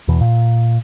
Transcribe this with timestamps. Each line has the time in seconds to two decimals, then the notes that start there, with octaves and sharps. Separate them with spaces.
0.08 E2 B2 E3
0.21 A#2